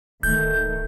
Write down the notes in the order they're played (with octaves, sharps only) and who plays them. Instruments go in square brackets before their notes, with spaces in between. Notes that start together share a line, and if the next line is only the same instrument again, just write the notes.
[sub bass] D1 [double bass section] D#3 A3 [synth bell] G6